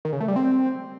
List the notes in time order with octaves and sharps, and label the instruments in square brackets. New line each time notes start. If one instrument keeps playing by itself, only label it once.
[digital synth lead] D#3
C#3
A3
G3
C4